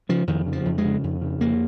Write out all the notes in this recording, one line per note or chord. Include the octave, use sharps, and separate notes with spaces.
C#3 F3
F2 D#3
C#3
F3
F2
G#3
C#3
F2
C#3
F2 A#3